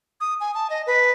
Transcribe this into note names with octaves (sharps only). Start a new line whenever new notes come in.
D#6
G#5
A5
D#5
B4